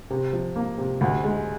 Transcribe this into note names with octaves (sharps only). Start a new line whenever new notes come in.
C3
F3
A#3
C3
D2
G#3